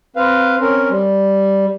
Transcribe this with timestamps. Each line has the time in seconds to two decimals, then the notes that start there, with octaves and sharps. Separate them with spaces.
0.16 C4 B4 F5
0.60 C4 C#4 A#4
0.90 G3